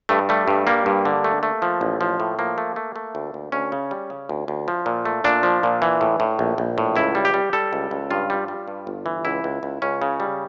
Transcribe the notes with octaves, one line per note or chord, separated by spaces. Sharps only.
G2 A3
G3 A3
G2
G3 A#3
G2
D3
A3
A3
F3
A1
F3
A2
F3 A#3
A3
A3
A3
D2
D2
D2 C#4
C#3
G3
C#3
D2
D2
F3
A#2
A3
A#2 D4
F3
A#2
E3
A2
A2
A#1
A#1
A2
C#2 E4
G3
G4
G3
G3 A4
C#2
C#2
G2 F4
G3
G3
G2
G1
E3
C#2 E4
C#2
C#2
C#2 C#4
C#3
G3